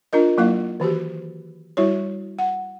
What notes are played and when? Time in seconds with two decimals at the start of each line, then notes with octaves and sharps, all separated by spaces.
0.13 D4 F4 A#4 D#5
0.38 F#3 A#3 E4 F5
0.80 D#3 E3 F#4 G4
1.77 G3 E4 F#4 C#5
2.39 F#5